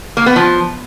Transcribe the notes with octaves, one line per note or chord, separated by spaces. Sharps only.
A#3
B3
F3